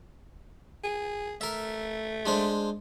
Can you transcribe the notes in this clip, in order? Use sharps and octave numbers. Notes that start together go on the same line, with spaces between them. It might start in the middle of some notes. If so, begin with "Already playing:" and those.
G#4
A3 A#4 E5
G#3 D4 C5